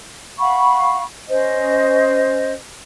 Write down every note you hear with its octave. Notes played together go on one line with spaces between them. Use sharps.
F5 F#5 B5 C#6
C#4 C5 D#5